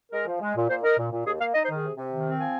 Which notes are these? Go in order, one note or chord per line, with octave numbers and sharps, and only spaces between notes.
G#3 A#4
F3
G#3
A#2
A#2 C5
D#4 A#4
A#2
A#2
D#2 G#4
A#3 F5
D#4 D#5
C5
D#3 G#4
C3
C3
D#3
C4
F3 G#5